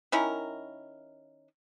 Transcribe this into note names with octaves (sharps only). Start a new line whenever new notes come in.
D#3 C#4 E4 A#4